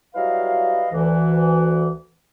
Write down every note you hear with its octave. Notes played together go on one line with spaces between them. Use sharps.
F#3 G3 E4 B4 D#5 F5
D2 E3